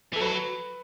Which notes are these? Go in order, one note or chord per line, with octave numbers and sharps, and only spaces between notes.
E3 A4
F#3 B4